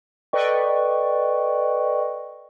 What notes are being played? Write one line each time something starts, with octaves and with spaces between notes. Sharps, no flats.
A4 B4 D5 D#5 G5 C#6